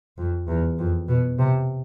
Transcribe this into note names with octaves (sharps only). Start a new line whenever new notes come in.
F2
E2
F2
B2
C3